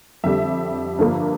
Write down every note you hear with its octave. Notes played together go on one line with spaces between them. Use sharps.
F2 D3 G3 E5
G2 D3 F3 A#3